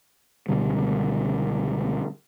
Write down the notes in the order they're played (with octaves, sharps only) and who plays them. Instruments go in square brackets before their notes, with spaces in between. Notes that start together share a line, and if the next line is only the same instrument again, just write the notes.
[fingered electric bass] C#2 B2 D3 G3